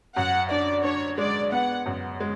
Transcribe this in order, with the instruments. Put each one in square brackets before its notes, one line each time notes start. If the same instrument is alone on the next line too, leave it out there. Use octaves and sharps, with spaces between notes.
[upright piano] F#2 [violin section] F#5
[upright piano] D4 [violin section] D5
[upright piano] D4 [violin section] C#5
[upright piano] G#3 [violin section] D5
[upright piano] B3 [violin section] F#5
[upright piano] F#2
G#3